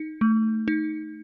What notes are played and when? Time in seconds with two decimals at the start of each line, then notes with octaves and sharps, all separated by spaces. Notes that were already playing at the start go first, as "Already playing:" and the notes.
Already playing: D#4
0.21 A3
0.68 D#4